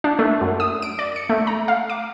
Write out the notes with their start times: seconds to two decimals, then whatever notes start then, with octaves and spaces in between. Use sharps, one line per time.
0.04 D4
0.19 A3
0.41 F#2
0.60 D#6
0.82 D7
0.99 D5
1.16 C#7
1.29 A3
1.47 A#5
1.68 F5
1.90 D6